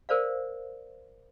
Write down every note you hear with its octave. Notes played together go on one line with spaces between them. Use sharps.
A#4 C5 D5 F5